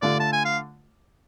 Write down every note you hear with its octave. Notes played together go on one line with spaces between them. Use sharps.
D3 A3 D4 F4 D5
A5
G#5
F5